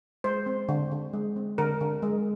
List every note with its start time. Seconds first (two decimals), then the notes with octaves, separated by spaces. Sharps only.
0.24 G#3 C5
0.46 C4
0.69 D3
0.91 D3
1.13 G#3
1.36 C4
1.58 D3 A#4
1.81 D3
2.03 G#3